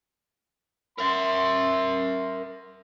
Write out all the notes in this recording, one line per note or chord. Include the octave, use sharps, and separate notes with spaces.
A#4 E5 C6